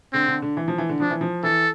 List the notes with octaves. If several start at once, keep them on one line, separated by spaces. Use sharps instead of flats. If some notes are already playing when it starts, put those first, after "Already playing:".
D3 C4
D3
D3
E3
F3
E3
D3
F3 D4
E3
F3
E3 A4